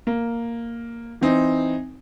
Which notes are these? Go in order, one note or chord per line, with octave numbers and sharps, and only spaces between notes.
A#3
E3 C4 D#4